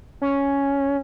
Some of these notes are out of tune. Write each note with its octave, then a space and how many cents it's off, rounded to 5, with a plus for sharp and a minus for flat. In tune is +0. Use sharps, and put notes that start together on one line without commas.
C#4 +5